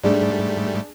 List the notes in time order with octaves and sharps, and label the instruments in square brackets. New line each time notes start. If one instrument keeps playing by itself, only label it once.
[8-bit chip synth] G#2 G3 A3 [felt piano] D4 G#4